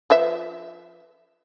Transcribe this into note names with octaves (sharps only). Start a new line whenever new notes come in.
F3 B4 E5